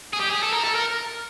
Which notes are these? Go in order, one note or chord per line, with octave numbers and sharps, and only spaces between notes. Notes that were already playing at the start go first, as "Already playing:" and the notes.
G#4
G4
G#4
A4
A#4
A4
A#4